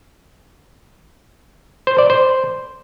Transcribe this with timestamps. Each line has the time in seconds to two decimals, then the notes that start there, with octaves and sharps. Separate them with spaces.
1.87 C5
1.98 D5
2.10 C5